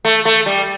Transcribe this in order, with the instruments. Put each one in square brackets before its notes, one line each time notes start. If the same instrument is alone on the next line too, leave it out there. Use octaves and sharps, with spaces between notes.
[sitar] A3
A3
G3